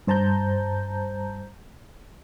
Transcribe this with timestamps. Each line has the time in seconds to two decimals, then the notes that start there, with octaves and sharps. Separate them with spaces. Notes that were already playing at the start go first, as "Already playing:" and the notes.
0.07 G2 C5 A5 A#5 G6